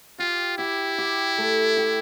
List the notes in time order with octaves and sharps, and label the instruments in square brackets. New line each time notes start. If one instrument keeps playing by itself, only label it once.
[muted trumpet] F4 [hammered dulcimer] G4
[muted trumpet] E4 [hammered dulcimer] G4
[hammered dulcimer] G4
A3
G4